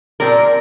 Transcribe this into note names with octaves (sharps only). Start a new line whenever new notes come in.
A#2 G3 C4 A#4